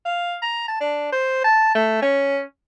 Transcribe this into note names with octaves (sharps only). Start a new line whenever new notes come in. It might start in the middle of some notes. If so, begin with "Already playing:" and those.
F5
A#5
A5
D4
C5
A5
A3
C#4